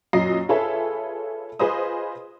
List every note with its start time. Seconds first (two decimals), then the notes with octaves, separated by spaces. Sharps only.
0.13 F#2 A#2 F#3 D#5 C7
0.49 F4 G#4 A4 B4 C#5 E5
1.59 F4 G#4 B4 C5 D#5 D#6